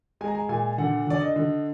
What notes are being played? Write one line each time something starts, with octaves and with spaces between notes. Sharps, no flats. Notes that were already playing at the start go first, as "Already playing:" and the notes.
G#3 G#5
A#5
G#5
A#2 G#5
D3 F#5
D3 D5
D#5
D3